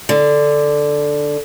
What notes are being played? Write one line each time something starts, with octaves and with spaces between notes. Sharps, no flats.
D3